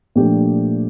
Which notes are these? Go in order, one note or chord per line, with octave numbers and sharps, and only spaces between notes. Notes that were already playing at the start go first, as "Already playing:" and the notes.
A#2 F3 A3 D4 G4